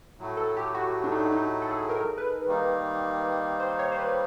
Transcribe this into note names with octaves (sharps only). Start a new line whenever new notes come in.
A2 F#3 A3
A4
G4
F#4
D4
D#4
D4
D#4
A4
G#4
A#4
B4
D#3 G3 A#3 D#4
C5
C#5
C5
B4